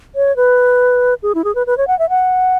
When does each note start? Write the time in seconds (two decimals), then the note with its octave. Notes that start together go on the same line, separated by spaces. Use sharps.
0.15 C#5
0.36 B4
1.23 G#4
1.35 E4
1.44 G#4
1.55 B4
1.67 B4
1.78 C#5
1.88 F#5
1.99 E5
2.09 F#5